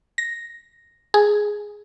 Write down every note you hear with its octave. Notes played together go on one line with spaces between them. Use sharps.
A#6
G#4